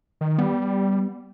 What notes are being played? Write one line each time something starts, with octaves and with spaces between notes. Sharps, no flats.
D#3
G3 B3